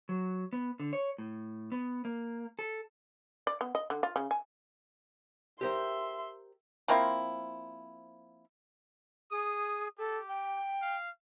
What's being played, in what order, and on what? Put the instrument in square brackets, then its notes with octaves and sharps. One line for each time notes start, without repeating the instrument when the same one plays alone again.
[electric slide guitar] F#3
B3
D3
C#5
A2
B3
A#3
A4
[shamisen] D5
B3
D#5
D3
F4
C#3
G#5
[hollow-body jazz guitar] G4 A#4 C5 [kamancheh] E5 C6
[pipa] F3 A#3 C4 E4
[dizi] G#4 [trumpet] D#6
[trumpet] G4 [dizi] A4
[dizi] G5
[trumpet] F5